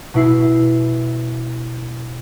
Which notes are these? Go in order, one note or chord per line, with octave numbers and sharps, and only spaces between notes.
B2 E4 C7